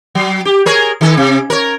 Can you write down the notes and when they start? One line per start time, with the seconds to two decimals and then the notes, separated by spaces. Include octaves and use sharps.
0.15 F#3
0.45 G4
0.66 G#4 A#4 C#5
1.01 D#3 A4
1.17 C3
1.50 A#4 C#5